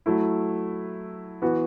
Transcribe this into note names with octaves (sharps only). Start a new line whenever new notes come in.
F#3 A3 E4
E3 B3 F#4